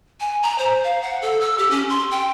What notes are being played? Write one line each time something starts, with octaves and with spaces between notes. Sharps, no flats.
G#5
A#5
C5
F5
F#5
A4
E6
G4
C#4
C6
G5